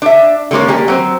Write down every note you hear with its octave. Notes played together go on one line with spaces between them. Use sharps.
D4 E5
D3 G3 G#3 A#3 C#4
G3 A#3 G#4
F#3 C4